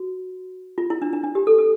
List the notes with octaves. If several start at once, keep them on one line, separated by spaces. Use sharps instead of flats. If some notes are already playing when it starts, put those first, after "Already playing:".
Already playing: F#4
F4
E4
D4
D4
D4
G4
A4
A4